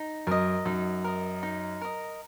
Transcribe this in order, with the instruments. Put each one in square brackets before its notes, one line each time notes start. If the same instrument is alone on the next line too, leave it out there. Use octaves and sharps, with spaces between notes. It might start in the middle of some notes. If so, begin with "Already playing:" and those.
Already playing: [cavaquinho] D#4
[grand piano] F#2 [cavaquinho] A#4 D#5
[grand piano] F#2 [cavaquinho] D#4
[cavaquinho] A#4 D#5
D#4
A#4 D#5